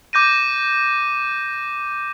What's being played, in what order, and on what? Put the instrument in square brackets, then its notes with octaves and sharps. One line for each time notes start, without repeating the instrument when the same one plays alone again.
[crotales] D6 G6 A#6 D#7